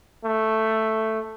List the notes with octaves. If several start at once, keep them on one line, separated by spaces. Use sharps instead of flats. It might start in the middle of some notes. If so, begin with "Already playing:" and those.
A3